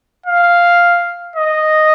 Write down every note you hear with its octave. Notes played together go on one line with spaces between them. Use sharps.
F5
D#5